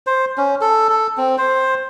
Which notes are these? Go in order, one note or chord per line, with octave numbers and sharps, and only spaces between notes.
C5
C#4
A4
A4
C4
C5